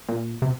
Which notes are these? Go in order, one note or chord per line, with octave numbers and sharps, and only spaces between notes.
A#2
C3